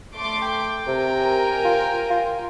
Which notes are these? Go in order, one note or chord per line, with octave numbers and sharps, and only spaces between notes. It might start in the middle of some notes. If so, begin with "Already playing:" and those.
A3 C6 D6
G5
C3 A#4 G#5
F4
F4